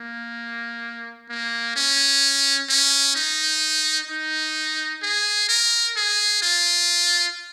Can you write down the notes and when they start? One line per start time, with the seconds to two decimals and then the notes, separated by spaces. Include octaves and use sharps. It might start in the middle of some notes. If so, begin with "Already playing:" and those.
Already playing: A#3
1.29 A#3
1.76 C#4
2.69 C#4
3.15 D#4
4.09 D#4
5.02 G#4
5.49 A#4
5.97 G#4
6.42 F4